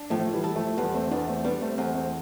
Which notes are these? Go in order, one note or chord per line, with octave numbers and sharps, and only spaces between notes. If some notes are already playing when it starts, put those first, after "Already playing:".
Already playing: D4
A2 F3 A3
E3 G3
A4
F3 A3
E2 G3 B3
A3 C4
E2 B3 D4
A3 C4
G3 B3 D4
A3 C4
E2 A3 C4
A3 C4